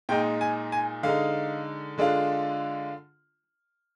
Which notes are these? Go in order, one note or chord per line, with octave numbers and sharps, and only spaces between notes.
A#2 G#3 D#4 G5
G#5
G#5
D3 G#3 D#4 F5
D3 G#3 D4 F4